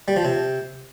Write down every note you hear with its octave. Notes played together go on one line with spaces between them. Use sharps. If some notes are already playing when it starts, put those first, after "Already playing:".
G3
F3
C3